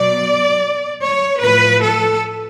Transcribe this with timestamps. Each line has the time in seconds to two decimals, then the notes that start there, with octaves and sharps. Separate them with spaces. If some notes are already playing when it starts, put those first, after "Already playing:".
Already playing: B2 F#3 D5
1.02 C#5
1.41 A2 F3 B4
1.82 A4